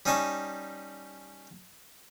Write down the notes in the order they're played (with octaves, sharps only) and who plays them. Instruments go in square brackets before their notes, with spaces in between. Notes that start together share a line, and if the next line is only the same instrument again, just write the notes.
[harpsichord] G3 C#4 D#4 G#5 A5 C#6